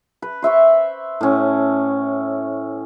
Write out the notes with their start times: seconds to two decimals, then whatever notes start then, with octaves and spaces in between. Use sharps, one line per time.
0.22 B4
0.42 C5 E5 B5 C#6
1.21 A2 C#4